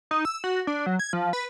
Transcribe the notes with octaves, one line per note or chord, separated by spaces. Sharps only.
D#4
E6
F#4
D4
F#3
G#6
F3
B4